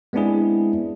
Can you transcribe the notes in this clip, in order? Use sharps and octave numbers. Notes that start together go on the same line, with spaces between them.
G#3 B3 C4 D4 E4 G#4